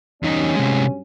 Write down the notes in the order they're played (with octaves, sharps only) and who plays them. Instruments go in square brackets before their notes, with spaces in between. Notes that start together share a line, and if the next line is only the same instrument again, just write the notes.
[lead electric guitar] E2 D#4 [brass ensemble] G2 F#3 C#4
[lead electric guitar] C3 G#3